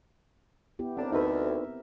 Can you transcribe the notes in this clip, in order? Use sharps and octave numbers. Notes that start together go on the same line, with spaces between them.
B3 E4 G4
D#2 D3 C4 D4 A#4
D2 D#4 B4 E5